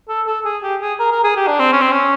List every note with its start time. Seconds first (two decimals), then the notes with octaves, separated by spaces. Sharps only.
0.09 A4
0.27 A4
0.45 G#4
0.63 G4
0.81 G#4
1.00 A#4
1.12 A#4
1.24 G#4
1.37 G4
1.48 D4
1.60 C4
1.73 C#4
1.81 C4
1.91 C#4